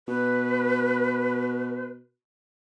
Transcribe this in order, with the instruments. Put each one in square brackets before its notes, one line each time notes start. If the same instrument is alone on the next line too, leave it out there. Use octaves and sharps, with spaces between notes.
[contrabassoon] B2 [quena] B4